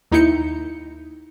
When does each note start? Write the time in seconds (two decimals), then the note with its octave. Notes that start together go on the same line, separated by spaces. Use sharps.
0.11 D#2 D#4 E4 G6 C#7